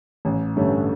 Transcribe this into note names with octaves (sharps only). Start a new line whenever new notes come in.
A1
G2 D3 A3 C#4